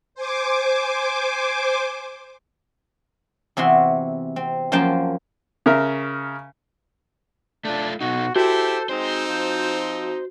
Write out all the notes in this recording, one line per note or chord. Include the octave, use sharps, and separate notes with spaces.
C5 G#5 D6
E2 C3 E4 F#4 C6
C4
F#2 F3 A#3 C5 G5 A5
C#3 A#4 E5
A3 D4 F4
B2 D#4 F#4
E4 F#4 G4 A4 C5
G#3 C4 D#4 C5
F3